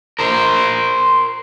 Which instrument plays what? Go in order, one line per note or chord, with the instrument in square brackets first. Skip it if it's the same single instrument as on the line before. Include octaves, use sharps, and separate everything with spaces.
[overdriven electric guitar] A#4 C5